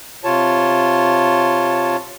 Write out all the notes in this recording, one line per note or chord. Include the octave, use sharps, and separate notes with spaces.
C3 F4 C#5 A5